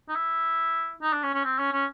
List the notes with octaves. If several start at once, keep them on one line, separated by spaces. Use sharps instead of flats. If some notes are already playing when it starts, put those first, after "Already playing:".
D#4
E4
D#4
D4
C#4
C#4
C4
C#4
C#4